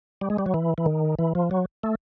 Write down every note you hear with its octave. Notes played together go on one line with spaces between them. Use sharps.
G3
G#3
G3
F#3
E3
E3
D#3
E3
F3
F#3
A3